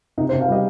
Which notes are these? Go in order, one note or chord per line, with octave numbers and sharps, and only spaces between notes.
C3 D#4
C5
C3
F5
G3 D#5